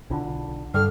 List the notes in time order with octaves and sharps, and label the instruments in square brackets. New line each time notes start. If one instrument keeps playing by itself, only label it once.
[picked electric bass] B1 D3 [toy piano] D4 E4 F4
[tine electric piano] G2 [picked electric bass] D3 [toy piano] A4 D6 [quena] F6